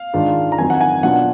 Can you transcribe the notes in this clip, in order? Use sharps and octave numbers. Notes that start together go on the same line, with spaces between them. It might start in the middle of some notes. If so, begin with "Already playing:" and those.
Already playing: F5
G#2 D#3 G#3 D4 F4
A#5
F2 D#3 F#3 G#5
F#5
G#5
B2 F#3 D4 F4 F#5